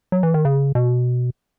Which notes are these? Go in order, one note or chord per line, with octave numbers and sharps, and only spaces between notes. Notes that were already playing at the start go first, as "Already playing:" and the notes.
F#3
E3
D#3
C#3
B2